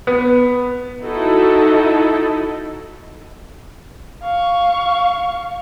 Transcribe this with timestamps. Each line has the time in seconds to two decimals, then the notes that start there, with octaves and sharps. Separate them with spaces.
0.07 B3
1.03 D#4 E4 F#4 A4 D#5
4.23 F5 C#6